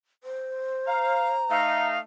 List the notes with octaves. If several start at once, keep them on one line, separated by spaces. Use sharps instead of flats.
C5
F5 A#5
A3 D#4 F5